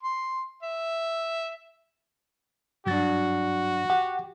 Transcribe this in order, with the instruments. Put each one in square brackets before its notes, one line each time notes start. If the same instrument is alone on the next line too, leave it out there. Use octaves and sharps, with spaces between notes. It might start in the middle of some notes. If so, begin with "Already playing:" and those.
[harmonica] C6
E5
[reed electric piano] G2 A6 [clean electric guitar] F#3 D4 [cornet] F#4
[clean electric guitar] G4 [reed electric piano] F#5